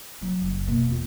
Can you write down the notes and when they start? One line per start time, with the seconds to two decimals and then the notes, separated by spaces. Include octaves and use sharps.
0.22 F#3 E4
0.42 F#1
0.67 B2 A#3
0.89 E2 F4